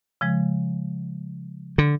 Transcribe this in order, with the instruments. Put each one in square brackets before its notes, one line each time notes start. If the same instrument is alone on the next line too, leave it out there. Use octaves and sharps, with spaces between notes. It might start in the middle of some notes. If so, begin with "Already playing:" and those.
[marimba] C#3 F3 G#3
[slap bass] D3